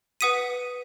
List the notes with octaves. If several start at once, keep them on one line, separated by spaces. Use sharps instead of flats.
B4 F#5 D#6 B6 D#7